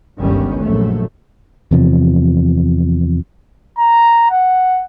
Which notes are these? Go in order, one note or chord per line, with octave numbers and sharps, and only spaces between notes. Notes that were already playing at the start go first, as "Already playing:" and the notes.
G1 C#2 G2 D#3 G3 C#4
A#1 F#2 A3
E2 C3 F3
A#5
F#5